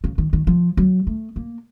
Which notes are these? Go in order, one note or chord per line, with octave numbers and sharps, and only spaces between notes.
C#3
D#3
D#3
F3
F#3
A3
A#3